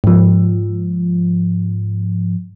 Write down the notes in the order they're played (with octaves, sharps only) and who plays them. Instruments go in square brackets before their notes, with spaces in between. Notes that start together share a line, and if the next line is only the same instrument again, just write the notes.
[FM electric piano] G#2 F3